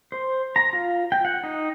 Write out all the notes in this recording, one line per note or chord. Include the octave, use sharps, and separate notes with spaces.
C5
A#5
F4
G5
F#5
D#4